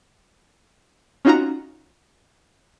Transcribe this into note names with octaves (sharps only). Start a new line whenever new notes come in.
C#4 D#4 F4 F#4 F#5 A#5